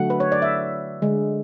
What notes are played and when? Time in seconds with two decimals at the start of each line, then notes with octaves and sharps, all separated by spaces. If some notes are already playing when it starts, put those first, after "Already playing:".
Already playing: D3 F#3 A3 F#5
0.10 B4
0.20 C#5
0.32 D5
0.42 E5
1.02 D3 G#3